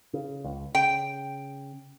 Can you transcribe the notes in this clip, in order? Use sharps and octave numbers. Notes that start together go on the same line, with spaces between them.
C#3
C#2
C#3 G5